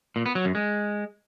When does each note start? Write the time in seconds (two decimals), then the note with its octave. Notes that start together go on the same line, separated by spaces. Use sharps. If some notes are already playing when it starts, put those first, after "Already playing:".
0.16 A#2
0.26 B3
0.35 F#3
0.45 F#2
0.55 G#3